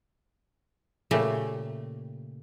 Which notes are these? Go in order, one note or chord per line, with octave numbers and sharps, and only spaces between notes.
A#2 C#3 A3 G4